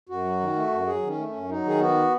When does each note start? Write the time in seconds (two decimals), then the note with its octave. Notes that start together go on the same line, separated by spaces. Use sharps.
0.09 F#2 F#4
0.25 F#3
0.40 D#3
0.55 A3
0.71 F#2
0.87 F#3 G#4
1.02 D#3
1.07 C#4
1.18 A3
1.28 F#2 C#4
1.49 F#3 D#4
1.64 D#3 G#4
1.80 B3 F#4